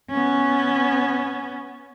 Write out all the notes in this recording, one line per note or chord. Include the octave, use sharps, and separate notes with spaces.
B3 C#4